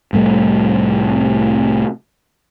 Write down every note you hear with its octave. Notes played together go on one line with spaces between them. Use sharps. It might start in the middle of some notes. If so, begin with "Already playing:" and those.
C2 A2 G3 A3